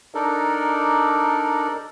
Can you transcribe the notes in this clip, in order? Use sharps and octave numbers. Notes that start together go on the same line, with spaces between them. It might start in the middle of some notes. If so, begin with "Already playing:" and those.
D4 D#4 A4 A#4 D5